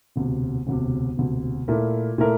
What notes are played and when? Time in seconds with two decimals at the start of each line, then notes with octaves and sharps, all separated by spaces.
0.16 E1 D2 C3
0.67 E1 D2 C3
1.18 E1 D2 C3
1.68 A#2 A3 E4 A#4
2.18 A#2 A3 E4 A#4